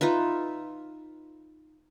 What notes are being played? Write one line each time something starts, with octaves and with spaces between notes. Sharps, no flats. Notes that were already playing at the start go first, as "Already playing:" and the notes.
D#4 F4 B4 E5